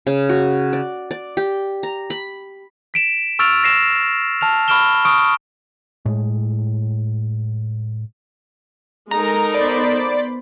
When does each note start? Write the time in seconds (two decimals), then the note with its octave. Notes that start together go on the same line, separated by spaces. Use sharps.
0.07 C#3
0.29 F#4
0.73 D5
1.11 D5
1.37 G4
1.83 A#5
2.10 B5
2.94 B6 D7 E7
3.39 C#6 E6 F6 A6 D7 F7
3.63 E6 A#6 C7 E7
4.41 A5 F6 F7
4.68 B5 C#6 F6 D7 E7 G7
5.05 C#6 D#6 F6 D7
6.06 A2 G#3
9.11 G#3 D#4 A4 A#4 A#5
9.55 B3 C5 D5 B5